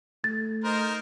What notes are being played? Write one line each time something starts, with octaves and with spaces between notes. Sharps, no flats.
A3 A6
D#4 A#4 C5